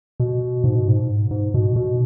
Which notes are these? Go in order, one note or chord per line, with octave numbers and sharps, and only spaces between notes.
B2
G#2
B2
G#2
G#2
B2
B2